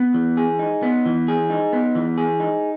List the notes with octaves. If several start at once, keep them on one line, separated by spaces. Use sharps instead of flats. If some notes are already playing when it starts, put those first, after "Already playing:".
Already playing: B3
E3
G#4
D#4
B3
E3
G#4
D#4
B3
E3
G#4
D#4